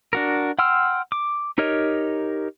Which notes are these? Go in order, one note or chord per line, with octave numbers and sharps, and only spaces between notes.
D4 F#4 A#4
F#5 G5 C6 E6 F6
D6
D#4 G4 A#4 C#5 D#5